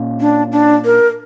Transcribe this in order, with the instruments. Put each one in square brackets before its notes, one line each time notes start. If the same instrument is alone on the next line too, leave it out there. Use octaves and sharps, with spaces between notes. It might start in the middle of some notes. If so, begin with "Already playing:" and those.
Already playing: [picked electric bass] A#2 A#3 C#4
[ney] D4
D4
A#4